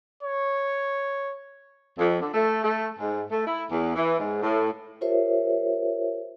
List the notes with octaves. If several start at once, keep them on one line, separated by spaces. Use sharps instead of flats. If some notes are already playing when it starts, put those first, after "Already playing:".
C#5
F2
D3
A3
A3
G#2
A3
E4
E2
E3
G#2
A2
F4 G4 A#4 C5 C#5 E5